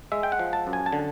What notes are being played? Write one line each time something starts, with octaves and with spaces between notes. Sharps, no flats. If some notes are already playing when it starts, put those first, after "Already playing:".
G#3 E5
G5
F#5
F3
A5
F#2
G#5
A5
D3